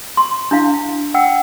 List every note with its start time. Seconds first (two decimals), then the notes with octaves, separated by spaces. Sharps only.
0.17 C6
0.51 D4 E4 F5
1.14 F#5 G5 E6